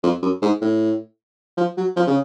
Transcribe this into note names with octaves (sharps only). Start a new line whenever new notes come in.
F2
F#2
G#2
A2
F3
F#3
F3
C#3